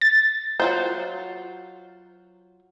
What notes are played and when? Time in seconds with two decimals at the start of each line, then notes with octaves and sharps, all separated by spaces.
0.01 A6
0.60 F#3 F4 C5